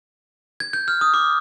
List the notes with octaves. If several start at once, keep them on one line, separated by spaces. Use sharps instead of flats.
G#6
G6
F6
D#6
D6